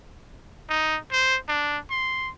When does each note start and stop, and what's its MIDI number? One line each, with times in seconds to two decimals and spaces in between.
0.69 0.97 63
1.12 1.36 72
1.48 1.78 62
1.91 2.30 84